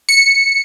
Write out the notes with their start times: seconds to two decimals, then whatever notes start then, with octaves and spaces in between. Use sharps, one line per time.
0.09 C#7